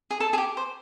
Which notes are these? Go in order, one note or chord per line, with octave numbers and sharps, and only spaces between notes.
G#4
A4
G#4
G4
C5